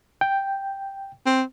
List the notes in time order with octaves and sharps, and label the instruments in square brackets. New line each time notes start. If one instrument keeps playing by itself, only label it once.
[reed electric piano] G5
[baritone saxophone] C4